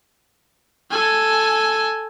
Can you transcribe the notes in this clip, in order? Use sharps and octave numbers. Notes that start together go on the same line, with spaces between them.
A4 G#5